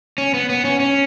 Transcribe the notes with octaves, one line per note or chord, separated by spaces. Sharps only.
C#4
B3
B3
C#4
C#4